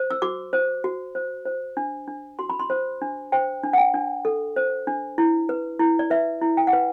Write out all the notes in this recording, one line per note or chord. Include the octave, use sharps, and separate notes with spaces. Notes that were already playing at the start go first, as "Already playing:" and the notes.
Already playing: C5
E6
F#4 D6
C5
F#4
C5
C5
D4
D4
F#4 C6
B5
C6
C5
D4
C5 G5
D4
F#5
G5
D4
A4
C5
D4
E4
B4
E4
D5
B4 E5
E4
G5
F#5
B4